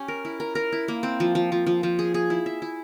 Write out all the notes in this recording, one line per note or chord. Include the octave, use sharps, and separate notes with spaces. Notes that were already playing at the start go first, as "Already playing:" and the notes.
Already playing: C#4 G4
A#4
E4
A#4
A#4
E4
A#3
C4
F3
F3
F3
F3
F3
G#4
G#4
E4
E5
E4